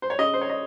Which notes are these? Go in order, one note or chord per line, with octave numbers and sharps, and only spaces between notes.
C5
C#5
C#3 D#5
C5
C#5
D#5